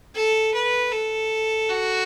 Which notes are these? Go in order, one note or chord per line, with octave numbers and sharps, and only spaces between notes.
A4
B4
A4
F#4